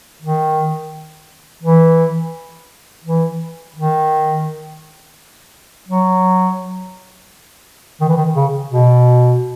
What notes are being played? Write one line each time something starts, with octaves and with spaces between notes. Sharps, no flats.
D#3
E3
E3
D#3
F#3
D#3
E3
D#3
C#3
B2